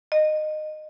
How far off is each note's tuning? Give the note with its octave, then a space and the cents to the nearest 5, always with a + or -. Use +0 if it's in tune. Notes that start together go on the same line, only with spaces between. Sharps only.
D#5 -20